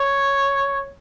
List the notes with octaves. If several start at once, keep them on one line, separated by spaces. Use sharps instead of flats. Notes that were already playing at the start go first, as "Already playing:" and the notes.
Already playing: C#5